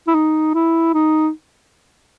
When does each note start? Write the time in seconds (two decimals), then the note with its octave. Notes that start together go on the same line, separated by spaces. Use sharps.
0.07 E4
0.15 D#4
0.54 E4
0.94 D#4